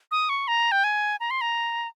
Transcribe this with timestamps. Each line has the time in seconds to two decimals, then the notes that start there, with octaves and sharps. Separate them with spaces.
0.11 D#6
0.29 C#6
0.48 A#5
0.72 G5
0.84 G#5
1.20 A#5
1.31 C6
1.41 A#5